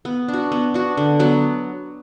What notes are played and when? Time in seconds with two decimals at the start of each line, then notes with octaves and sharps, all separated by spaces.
0.05 B3
0.28 D4
0.33 F#4
0.52 B3
0.74 D4 F#4
0.97 D3
1.19 F#3 B3